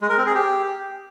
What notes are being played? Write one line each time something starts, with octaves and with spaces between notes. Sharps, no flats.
G#3
A#4
C4
G#4
G4